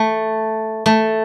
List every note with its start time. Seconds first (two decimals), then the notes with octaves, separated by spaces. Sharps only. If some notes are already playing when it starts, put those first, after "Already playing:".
Already playing: A3
0.86 A3